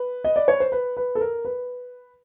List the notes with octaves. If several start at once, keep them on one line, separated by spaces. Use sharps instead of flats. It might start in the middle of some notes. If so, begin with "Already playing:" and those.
Already playing: B4
D#5
D5
C#5
C5
B4
B4
A4
A#4
B4